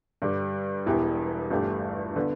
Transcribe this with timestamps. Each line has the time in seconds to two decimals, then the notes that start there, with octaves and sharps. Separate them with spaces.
0.22 G2 D3 G3
0.86 E1 E2 E3 B3 G4
1.51 G1 G2 E3 A3 G4
2.16 D3 B3